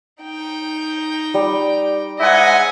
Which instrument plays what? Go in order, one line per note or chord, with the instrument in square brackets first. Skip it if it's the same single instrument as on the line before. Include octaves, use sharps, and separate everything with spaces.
[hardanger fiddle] D#4 G5
[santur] G3
[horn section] G#2 E5 F#5 [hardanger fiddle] D#5 G#5